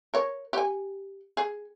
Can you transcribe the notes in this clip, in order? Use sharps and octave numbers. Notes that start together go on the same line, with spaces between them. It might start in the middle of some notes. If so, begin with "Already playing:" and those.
A#4 C#5
G4 G#5
G#4